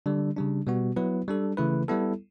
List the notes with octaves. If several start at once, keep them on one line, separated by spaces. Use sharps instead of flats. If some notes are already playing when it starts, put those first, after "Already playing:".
D3 G3 D4
C#3 G3 D4
B2 G3 B3 F#4
F#3 B3 E4 B4
G3 D4 A4
C#3 E3 A3 E4 B4
G3 B3 E4 A4